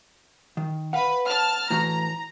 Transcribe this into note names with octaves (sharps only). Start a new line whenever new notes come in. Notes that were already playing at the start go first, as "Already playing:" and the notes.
D#3
B4 F5 F#5
A5 F6
A2 E3 F#4 A#5